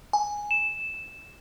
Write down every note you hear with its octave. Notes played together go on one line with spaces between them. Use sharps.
G#5
E7